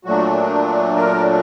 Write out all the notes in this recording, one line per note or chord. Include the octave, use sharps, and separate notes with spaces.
A#2 F#3 A3 D4 F#4
A#4